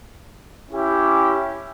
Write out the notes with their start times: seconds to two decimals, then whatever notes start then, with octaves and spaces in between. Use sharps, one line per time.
0.70 C#4 E4 G4